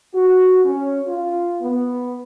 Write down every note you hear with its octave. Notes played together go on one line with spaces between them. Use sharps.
F#4
C#4
F4
B3